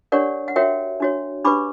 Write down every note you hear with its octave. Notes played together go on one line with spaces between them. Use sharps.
D4 G4 A#4 C#5 D5 F#5
F#5
F#4 A#4 C#5 E5 G5
D4 F#4 C#5
D4 G4 B4 B5 D6